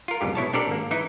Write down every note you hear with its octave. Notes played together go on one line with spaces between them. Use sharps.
F4 A#4
B1 F2 G#2 G4
B2 E4 C#5 A5
C4 D4 G4 A4 A#4 D5
G#1 A#3
E3 D#4 E4